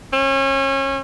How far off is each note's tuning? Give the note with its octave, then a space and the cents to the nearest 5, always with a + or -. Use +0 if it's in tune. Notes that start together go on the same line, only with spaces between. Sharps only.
C#4 -30